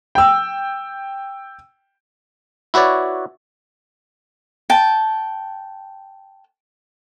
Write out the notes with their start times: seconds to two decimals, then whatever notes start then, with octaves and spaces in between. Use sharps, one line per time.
0.15 G5 E6
2.74 E4 F#4 B4 C#5 D5
4.70 G5 A5